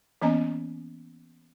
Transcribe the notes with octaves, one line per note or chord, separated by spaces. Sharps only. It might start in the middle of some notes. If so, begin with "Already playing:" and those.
E3 A#3 B3 C#4 D#5 A#5